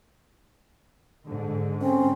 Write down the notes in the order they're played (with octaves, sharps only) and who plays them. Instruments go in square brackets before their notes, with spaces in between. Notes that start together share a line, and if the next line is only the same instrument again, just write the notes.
[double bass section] G#2 D3
[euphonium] C4 [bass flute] C#4